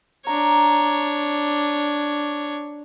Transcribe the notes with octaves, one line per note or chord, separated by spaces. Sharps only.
D4 C#5 A#5